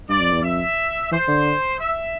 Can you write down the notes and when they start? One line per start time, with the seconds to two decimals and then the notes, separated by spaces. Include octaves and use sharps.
0.09 G2 D5
0.20 F2
0.31 E2
0.42 F2 E5
1.11 E3 C5
1.28 D3
1.79 E5